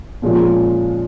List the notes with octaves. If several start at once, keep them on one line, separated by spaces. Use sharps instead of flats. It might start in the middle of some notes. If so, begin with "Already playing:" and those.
A#2 F3 G#3 C#4 F4